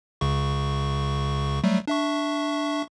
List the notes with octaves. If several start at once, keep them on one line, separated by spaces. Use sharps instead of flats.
C#2 C#3 C#6
F#3 G3 A3
D4 E5 C#6